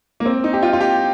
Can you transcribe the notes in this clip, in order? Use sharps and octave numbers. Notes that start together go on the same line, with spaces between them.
A#3
C4
D#4
G4
F4
F4
G4